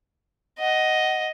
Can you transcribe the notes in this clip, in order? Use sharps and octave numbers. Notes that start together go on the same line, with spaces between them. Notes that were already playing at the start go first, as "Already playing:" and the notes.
D#5 F#5